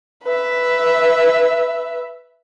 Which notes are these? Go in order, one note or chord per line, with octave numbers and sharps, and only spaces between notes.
B4 E5